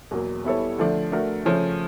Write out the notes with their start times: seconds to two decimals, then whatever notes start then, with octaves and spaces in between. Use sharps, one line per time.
0.11 E2 B2 F#3 A#3
0.44 G3 B3 E4 A4 C#5
0.78 D3 F3 A3 D4
1.12 A3 D4 F#4 A#4
1.45 C#3 F3 A3 C#4